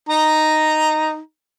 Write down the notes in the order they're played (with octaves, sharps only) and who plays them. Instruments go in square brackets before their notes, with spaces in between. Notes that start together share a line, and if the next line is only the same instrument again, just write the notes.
[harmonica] D#4 A#5